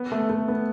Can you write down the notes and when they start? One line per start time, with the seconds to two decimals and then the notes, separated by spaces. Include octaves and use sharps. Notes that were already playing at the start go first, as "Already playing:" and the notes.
Already playing: B3
0.12 A3
0.30 A3
0.48 B3